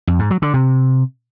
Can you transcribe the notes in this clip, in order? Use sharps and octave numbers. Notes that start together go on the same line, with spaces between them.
F2
G#2
F#3
D3
C3